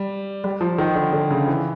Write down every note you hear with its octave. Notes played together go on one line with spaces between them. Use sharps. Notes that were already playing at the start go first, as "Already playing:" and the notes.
Already playing: G3
G3
F3
D#3
D3
D3
C#3
E3